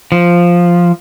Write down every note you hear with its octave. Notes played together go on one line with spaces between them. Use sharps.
F3